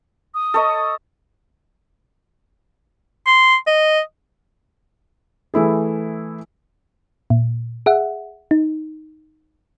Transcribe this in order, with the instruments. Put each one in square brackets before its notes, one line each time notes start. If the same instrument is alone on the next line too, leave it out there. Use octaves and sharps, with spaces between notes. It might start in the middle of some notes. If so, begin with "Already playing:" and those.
[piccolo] D#6
[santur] A4 C#5 D#5
[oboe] C6
D#5
[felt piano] E3 A3 E4 G#4
[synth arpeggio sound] A#2
G#4 E5 F#5
D#4